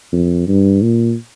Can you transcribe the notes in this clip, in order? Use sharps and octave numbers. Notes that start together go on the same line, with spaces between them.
F2
G2
A#2